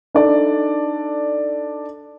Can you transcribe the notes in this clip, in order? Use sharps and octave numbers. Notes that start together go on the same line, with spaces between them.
D4 D#4 A4 D5